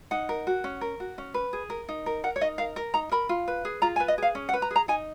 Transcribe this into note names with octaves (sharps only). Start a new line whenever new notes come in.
D#4 F#5
A#4
F#4
C#4
A#4
F#4
C#4
B4
G#4
A#4
D#4
A#4
A#4 F#5
C#5
D#4 D#5
A#4 F5
A#4
D#4 A#5
A#4 B5
F4
B4
G#4
F4 A#5
G#5
B4
D#5
G#4 F5
C#4
F#5
B4
A#5
G#4
A#5
D#4 G#5